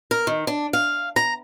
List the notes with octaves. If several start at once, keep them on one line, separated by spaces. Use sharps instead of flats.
A#4
D#3
D4
F5
A#5